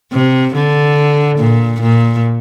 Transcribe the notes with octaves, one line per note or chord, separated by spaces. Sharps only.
C3
D3
A#2
A#2